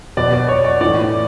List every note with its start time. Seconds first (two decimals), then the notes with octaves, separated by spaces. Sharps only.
0.17 B2 D5
0.33 D5
0.48 C#5
0.64 D5
0.81 A2 E3 D5